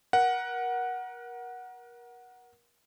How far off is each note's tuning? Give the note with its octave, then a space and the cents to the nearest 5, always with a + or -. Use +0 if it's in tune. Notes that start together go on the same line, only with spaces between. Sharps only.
A#4 +30 F#5 +0